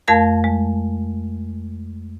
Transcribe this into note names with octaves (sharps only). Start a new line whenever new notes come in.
F2 A3 A#4 F5 A5 G6
G#3